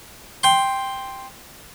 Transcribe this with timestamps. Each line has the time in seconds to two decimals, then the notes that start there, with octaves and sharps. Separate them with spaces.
0.43 G5 C6